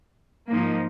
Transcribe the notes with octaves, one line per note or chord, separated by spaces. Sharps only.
G#2 F3 A#3 D#4